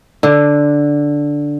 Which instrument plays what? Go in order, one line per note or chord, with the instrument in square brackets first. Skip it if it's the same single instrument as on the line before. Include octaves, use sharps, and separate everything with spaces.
[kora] D3